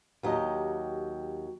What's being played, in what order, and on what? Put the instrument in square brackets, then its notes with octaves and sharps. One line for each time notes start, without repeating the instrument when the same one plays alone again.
[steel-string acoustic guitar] D#2 F#3 G4 D#5